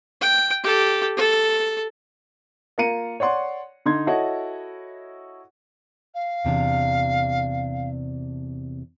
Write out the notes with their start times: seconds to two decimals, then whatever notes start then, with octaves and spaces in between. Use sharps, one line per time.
0.21 G5
0.63 G4 A4
1.17 A4
2.78 A#3 F4 A#5 C#7 D#7
3.20 C#5 D5 F#5 C6
3.86 D3 D#4 C6 G#6
4.07 E4 F#4 A4 C#5 D#5 F#5
6.14 F5
6.45 E2 C3 D4